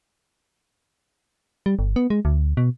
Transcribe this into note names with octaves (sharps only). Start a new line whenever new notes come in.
G3
G1
B3
G#3
D2
B2